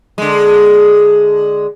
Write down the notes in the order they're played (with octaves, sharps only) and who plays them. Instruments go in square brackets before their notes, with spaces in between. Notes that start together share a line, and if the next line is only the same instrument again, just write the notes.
[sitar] D3 G#3